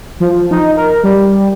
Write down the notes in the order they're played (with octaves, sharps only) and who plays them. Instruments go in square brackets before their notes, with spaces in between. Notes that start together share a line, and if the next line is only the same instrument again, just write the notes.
[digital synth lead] F3
D#4
A#4
G3